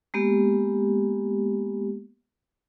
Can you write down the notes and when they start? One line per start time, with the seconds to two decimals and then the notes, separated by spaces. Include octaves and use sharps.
0.14 G#3 A#3 B3 G4